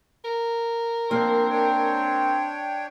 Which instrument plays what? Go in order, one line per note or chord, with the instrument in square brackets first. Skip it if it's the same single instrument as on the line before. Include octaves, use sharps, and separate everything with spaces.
[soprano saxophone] A#4
[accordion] F3 D4 [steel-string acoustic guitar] A#3 [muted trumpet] C4
[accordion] D4 C#5 G5